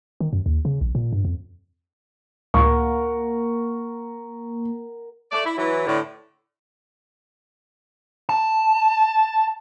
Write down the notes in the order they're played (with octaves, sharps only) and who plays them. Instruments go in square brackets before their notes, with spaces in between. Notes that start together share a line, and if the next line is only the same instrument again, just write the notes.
[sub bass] D#3
F#2
D#2
C#3
A#1
A#2
G2
F2
[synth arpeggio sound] C#2 A2 [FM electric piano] A#3 [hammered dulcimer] A#4 F#5 [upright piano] C#6
[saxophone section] A3 D5
E4
E3 F#3
A2 D3
[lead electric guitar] A5